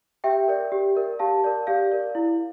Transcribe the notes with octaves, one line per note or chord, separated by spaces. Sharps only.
G4 E5 G5
A#4 D5
G4
A#4 D5
G4 F5 A5
A#4 D5
G4 D5 F5
A#4 D5
E4